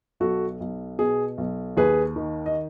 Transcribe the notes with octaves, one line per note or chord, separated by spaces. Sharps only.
B1 F#4 A4
B1
B2 G#4
B1
D#2 G#4 B4
D#3
D#5